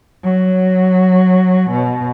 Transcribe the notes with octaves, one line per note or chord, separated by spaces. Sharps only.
F#3
B2